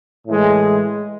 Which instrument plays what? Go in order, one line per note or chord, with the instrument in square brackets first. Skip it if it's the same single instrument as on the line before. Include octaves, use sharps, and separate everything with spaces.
[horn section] A2 E3 G#3